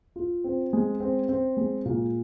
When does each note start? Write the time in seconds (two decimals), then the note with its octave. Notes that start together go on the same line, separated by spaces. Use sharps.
0.16 F4
0.44 C4
0.73 G#3
1.00 C4
1.29 C4
1.57 G#3
1.85 A#2